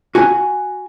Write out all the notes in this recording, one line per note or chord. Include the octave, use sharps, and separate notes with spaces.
F#4 G#5